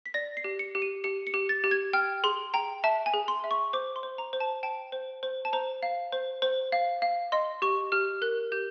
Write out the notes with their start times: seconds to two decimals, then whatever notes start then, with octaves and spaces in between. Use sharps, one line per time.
0.06 B6
0.14 D5 A#6
0.37 C7
0.44 G4
0.59 C#7
0.75 G4
0.82 D#7
1.04 G4 C#7
1.27 C#7
1.34 G4
1.49 A6
1.64 G4
1.71 G#6
1.93 G5 F6
2.24 G#4 C6
2.54 G5 A#5
2.84 E5 A5
3.06 G#5
3.14 G#4
3.28 C6
3.44 E5
3.51 C#6
3.73 C5 D6
3.96 C6
4.03 C5
4.18 A#5
4.33 C5
4.40 A5
4.63 G5 A5
4.92 C5
5.23 C5
5.45 A5
5.53 C5 A#5
5.83 F5
6.12 C5
6.42 C5
6.72 F5
7.02 F5
7.32 D#5 C6
7.62 G4 C#6
7.92 G4 F6
8.22 A#4 F#6
8.52 G4 G6